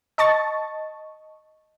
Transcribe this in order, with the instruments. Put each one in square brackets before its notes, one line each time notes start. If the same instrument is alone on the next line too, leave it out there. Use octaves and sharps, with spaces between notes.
[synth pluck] D#5 A5 C#6 A6